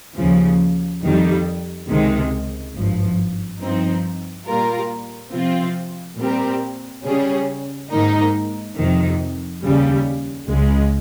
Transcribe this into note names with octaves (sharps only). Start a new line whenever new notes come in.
D#2 C#3 F3
F2 D#3 G3
C#2 C3 D#3 G#3
G#1 G2 F3
G2 F3 C4 D#4
A#2 G3 A#3 F4 A#4
C3 F3 C4 F4
A#2 G3 C4 G4 A#4
C#3 G3 C#4 G#4
G#2 D#3 A#3 D#4
F2 C3 D#3
D#2 C#3 G3
C#2 C#3 G#3